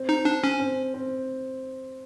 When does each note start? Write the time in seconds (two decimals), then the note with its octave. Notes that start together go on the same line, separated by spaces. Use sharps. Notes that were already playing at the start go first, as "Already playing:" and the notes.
Already playing: C4
0.09 D#4
0.25 D4
0.44 C#4
0.60 C4
0.94 C4